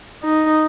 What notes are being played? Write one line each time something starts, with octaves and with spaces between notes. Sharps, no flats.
D#4